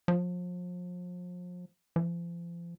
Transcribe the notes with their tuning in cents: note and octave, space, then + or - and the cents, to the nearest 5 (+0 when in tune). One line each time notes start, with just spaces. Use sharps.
F3 +35
F3 -35